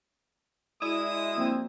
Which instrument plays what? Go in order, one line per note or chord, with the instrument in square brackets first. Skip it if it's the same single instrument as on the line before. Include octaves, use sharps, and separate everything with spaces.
[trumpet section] G#3 D#6 [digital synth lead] E4 [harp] F#4 D5
[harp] F3 A#3 D4 [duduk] C4